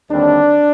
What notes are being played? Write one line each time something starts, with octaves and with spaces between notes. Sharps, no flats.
D#2 D3 G3 C4 D4